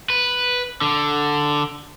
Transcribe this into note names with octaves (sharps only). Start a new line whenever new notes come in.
B4
D3